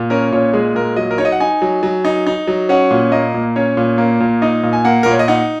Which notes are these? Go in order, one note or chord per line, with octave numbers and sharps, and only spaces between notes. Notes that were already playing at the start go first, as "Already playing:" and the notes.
Already playing: A#2
C#4 A#4
A#2 C#5
G#3 G#4
A#2 A#4
F#3 D#5
A#4
D#4 C#5
D#5
F#5
D#4 G#5
F#3
F#3
D#4
D#4
F#3
C#4 F#5
A#2
A#3 D#5
A#2
C#4 C#5
A#2
A#3
A#2
D#4 D#5
A#2
G#5
A#3 F#5
A#2 A#4
C#5
D#5
D#4 F#5